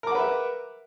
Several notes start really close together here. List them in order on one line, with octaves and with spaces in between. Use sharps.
A#4 D6 F#5 B4 E5